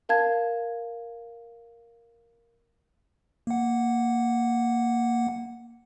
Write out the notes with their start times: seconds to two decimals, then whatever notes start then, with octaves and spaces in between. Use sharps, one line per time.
0.09 A#4 F5 A5 G#6
3.47 A#3 F#5